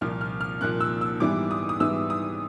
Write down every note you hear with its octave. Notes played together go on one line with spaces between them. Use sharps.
C2 A#2 F3 A#3 F6
F6
F6
C2 A#2 F3 A#3 F#6
E6
E6
G#2 E3 G3 B3 D6
D#6
D#6
G#2 E3 G3 B3 E6
D#6